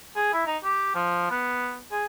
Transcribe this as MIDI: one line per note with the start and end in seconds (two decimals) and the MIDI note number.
0.16 0.30 68
0.33 0.42 64
0.47 0.57 63
0.64 0.92 67
0.95 1.26 53
1.31 1.78 59
1.92 2.06 68